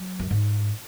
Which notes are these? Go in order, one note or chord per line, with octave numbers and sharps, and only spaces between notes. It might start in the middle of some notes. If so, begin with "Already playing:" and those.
Already playing: F#3
F#2
G#2